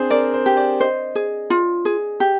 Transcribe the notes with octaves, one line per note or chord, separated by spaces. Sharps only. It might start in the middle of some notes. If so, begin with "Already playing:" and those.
Already playing: C4 D4 G#4 C5
A#4 D5
C5
G4
D5
C5 D#5
G#4
F4
G#4
G4